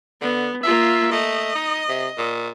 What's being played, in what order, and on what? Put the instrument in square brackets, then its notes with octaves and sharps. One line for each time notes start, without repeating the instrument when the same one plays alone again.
[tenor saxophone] D3 [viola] B3
[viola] A#3 F4 [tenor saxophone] E5
[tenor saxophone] A3 [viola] D#5
[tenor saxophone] D#4
C3
A#2